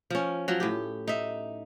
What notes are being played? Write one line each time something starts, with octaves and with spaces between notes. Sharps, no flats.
F3 C#4
F3 F#3
A2 G4
D#4 E5